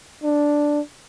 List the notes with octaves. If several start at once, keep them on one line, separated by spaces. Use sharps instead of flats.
D4